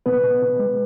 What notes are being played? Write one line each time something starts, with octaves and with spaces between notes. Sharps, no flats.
B2 B3 B4
B2
B2
G#3